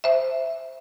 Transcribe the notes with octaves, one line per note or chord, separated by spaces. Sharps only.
C5 E5